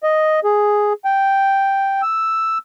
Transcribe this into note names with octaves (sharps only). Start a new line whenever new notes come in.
D#5
G#4
G5
E6